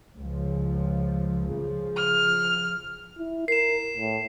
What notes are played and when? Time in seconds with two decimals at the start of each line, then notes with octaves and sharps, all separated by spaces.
0.17 C#2 F3
1.52 C#3 F3
1.96 F6
3.19 E4
3.48 A#4 C7 E7
3.97 A2